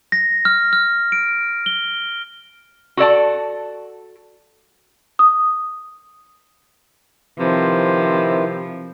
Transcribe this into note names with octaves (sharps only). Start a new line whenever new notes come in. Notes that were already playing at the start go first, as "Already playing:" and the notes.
A#6
F6
F6
D7
G7
F#4 A4 D5 A5
D#6
C3 D#3 F3 E4 B4